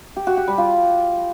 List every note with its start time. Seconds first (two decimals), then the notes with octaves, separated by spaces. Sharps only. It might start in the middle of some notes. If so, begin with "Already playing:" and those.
0.16 G4
0.27 F#4
0.37 G4
0.48 G3
0.58 F4